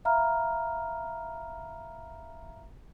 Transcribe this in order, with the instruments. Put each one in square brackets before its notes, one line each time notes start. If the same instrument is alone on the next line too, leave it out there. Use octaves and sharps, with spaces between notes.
[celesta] E5 F5 A#5 B5 F6